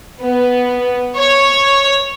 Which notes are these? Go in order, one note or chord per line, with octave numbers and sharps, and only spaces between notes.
B3
C#5